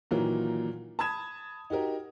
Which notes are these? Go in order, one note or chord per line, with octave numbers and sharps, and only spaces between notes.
A#2 D#3 E3 F#3 F4 A#4
A5 B5 D#6 G#6 E7
D#4 F#4 G4 A#4